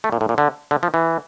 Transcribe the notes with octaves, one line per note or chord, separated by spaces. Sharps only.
A3
A#2
A2
A#2
D3
D3
F3
E3